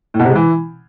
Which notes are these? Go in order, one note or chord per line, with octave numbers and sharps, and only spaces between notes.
A2
B2
C3
G#3
E3